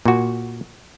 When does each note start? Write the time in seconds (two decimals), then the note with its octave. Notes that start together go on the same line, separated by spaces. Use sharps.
0.06 A#2 F#4